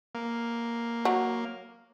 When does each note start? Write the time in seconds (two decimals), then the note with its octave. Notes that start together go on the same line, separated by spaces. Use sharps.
0.15 A#3
1.05 F#3